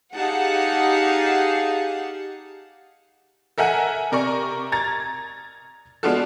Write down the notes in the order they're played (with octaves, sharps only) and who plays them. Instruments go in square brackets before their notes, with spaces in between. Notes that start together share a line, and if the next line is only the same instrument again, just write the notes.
[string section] D#4 G4 G#4 F5 F#5 A5
[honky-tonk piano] A4 A#4 E5 F#5 G#5
C3 A#4 D5 C#6
A#5 G#6 A6
G#3 B3 D4 F4 F#4 A4